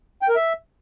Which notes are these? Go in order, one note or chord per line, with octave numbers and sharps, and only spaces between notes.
G5
A#4
E5